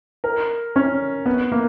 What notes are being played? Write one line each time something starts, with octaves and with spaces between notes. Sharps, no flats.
A#4
C#4
B3
A#3